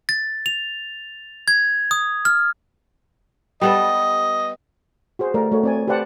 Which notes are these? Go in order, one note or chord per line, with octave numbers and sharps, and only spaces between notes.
A6
F7
G#6
D#6
F6
G3 B3 A4 D#5
F#4 G#4 C5
A3 A#4 D5
A3 F#4 C#5
C4 D5 G#5
G4 B4 C5 D5 F#5 A5